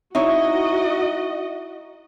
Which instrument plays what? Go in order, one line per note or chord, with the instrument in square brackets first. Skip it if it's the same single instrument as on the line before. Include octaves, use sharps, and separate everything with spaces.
[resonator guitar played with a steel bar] D#4 E4 C#5 [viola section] F#4 D#5 [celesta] E5